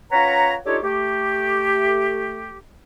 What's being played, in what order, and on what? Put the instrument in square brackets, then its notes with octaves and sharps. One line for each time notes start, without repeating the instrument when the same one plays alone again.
[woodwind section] C#4 F4 B4 C#5 F#5 A#5
D4 D#4 F4 G4 A4 C#5
A3 G4